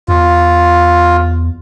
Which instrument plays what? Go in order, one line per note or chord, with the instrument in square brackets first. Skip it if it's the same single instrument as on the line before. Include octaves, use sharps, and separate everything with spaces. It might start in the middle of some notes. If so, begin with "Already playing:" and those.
[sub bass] E2 [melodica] F4